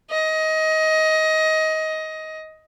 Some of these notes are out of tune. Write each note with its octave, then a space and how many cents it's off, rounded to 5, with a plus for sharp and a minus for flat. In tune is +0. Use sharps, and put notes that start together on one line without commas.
D#5 +20